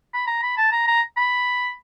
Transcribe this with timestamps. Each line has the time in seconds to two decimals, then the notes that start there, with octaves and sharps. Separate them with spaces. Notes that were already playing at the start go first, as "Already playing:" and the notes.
0.14 B5
0.27 A#5
0.43 B5
0.57 A5
0.72 A#5
0.87 A#5
1.17 B5